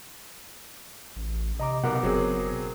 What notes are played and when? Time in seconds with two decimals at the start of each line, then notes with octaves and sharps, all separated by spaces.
1.16 A1
1.60 C3 D#5 A#5 D6
1.84 B1 B2 A#4 F#5 D6
2.03 F#1 F#3 C4 G#4